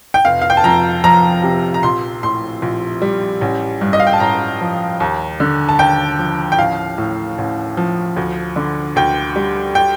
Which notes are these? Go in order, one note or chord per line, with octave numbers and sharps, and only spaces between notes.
G5
F1 F5
F5
G5
A5
F2 A#5
F3 A#5
C3
A#5
A#1 C6
A2 C6
A#1
G3
A1
G2
D#5
F5
G5
A5
A1 A#5
F3
D#2
D3
A5
D#2 G5
F3
G5
A1 F5
A2
A1
F3
D2
D3
D2 G5
G3
G5